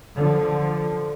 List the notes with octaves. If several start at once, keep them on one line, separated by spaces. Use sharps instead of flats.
D3 F3